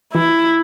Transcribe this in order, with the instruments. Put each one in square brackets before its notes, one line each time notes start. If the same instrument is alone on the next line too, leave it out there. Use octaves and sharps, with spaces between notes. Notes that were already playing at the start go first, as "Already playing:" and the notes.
[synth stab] E3 [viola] E4